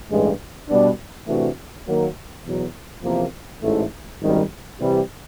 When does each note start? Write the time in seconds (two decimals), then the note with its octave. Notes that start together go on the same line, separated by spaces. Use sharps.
0.10 A1 G2 E3 G#3
0.69 B2 G3 B3 D4
1.28 C3 E3 A3 D4 F#4
1.87 D#3 F#3 A#3
2.45 E2 B2 F#3
3.04 E2 C3 F3 A#3
3.63 A1 G#2 E3 A3
4.21 G#1 F#2 D#3 G3
4.80 C3 E3 G3